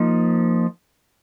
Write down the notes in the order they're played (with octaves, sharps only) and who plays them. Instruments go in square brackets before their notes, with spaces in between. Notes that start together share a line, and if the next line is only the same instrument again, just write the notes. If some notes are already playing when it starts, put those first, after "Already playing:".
Already playing: [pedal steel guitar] F3 A#3 D#4